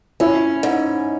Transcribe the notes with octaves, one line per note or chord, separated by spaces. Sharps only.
C#4 E4
G#2